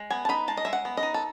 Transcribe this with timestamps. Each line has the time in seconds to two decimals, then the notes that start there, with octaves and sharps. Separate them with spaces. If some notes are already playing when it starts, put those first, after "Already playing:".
Already playing: G#3
0.10 B3 G#5
0.25 A5
0.29 D#4 B5
0.48 G#3 A5
0.57 D#5
0.65 G#3 E5
0.73 F#5
0.85 B3
0.97 D#5
1.03 D#4
1.14 A4